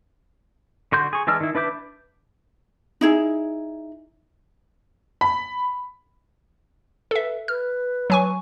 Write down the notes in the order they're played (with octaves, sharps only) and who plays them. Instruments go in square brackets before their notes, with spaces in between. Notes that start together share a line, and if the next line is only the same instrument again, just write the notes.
[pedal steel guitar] D3 F#4 C6 G6
G#4 C#6
E3 G#3 D4 E6 F6
D#3 E4
D4 B4 E5 D6 G6
[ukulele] D#4 E4 G#4
[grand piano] B5
[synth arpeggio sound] A4 E5 [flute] B4
[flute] B4 [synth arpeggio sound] F6
[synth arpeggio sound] F#3 G#5 C#6 [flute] B4